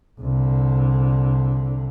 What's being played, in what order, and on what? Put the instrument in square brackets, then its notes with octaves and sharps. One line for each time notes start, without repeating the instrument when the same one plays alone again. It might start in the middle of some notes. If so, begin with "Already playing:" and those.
[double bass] C2 D3